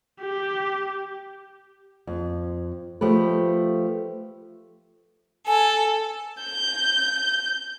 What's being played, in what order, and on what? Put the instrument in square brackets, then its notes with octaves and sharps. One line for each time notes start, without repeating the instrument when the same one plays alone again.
[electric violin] G4
[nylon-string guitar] F2
F3 A3 G4 B4
[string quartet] A4 [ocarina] G#5
[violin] G6